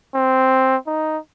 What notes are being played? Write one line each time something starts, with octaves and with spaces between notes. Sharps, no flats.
C4
D#4